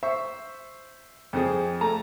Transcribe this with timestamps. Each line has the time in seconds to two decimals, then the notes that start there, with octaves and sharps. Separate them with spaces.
0.03 C5 E5 C#6
1.33 F2 C4 G#4
1.81 A3 A5 A#5